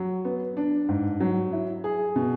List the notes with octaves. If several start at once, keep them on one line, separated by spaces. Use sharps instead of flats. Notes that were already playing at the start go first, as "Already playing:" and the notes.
Already playing: F#3
B3
D4
G#2
F#3
E4
G#4
B2